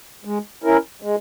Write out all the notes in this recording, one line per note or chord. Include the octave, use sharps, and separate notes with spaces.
G#3
C#4 E4 A#4
G#3